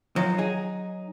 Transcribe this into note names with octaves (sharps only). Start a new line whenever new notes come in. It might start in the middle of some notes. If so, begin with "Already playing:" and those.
D#3 F3 F#3
D#4 G#4